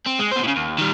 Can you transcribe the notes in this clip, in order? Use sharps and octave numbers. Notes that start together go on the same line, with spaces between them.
C4
G#3
B2 C5
A2 C#3
D#2
D#3 G3